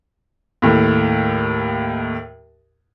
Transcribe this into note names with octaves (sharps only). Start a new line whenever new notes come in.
D#2 A2